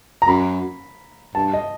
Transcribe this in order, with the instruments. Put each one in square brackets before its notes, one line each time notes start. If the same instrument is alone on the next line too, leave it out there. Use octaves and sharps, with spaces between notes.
[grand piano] A#5
[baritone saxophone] F#2 [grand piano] B5
[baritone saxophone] G2 [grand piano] A5
[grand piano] D#5